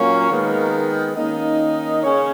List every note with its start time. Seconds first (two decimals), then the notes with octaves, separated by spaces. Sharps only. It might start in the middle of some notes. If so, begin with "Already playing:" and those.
Already playing: A#2 F#3 A#3 C#4 A#4
0.29 D#3 G#3 B3
1.15 D#3 A#3 C#4 D#4 D#5
2.02 C#3 C#4 C#5